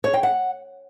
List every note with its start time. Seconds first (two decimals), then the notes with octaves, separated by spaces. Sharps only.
0.04 C#5
0.14 G5
0.23 F#5